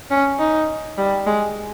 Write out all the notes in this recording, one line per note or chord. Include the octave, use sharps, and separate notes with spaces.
C#4
D#4
G3
G#3